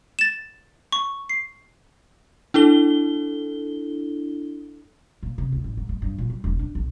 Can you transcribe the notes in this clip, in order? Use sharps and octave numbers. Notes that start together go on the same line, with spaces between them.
A6 E7
C#6
C7
D4 E4 A4 G7
A#2
C3
C#2
A1
G#2
G#3
G2
A#2
G3
E1
D4
B1